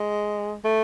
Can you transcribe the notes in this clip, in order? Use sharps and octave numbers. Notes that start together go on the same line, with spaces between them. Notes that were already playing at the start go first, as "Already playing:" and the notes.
Already playing: G#3
A3